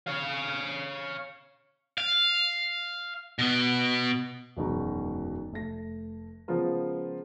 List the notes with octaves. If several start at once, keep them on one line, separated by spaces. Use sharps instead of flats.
C#5 F5
F5
B2 B3
E1 F#2 B2 D#3 G#3 A#5
F1 A3 A#6
C#3 F3 G#3 B3 F4 A#4